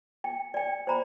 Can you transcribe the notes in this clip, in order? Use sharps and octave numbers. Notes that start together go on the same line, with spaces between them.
G5
D5 G5
C5 D5 A#5 B5